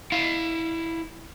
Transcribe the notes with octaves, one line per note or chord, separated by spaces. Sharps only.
E4 F5